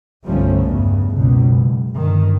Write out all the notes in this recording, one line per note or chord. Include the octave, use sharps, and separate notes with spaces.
G1 C2 F3 G3 A3 C#4
E2 G2 C#3
F#1 C#2 B2
F#1
G1 G2 D#3